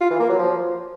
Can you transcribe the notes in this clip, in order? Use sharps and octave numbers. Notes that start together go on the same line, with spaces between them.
F4
E3
A#3
F#3
F3